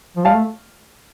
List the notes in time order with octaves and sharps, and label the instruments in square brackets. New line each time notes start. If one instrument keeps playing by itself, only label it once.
[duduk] F3
[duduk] G3 [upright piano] F5 A5
[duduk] A3